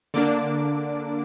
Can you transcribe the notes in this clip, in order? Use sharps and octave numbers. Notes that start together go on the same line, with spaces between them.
D3 A#3 D4 D6